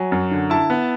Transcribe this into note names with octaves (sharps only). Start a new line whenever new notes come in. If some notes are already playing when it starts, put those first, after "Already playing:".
Already playing: F#3 G#5
F#2
D3
E4 A5
B3